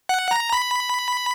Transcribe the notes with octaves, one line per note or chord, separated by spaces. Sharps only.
F#5
A#5
B5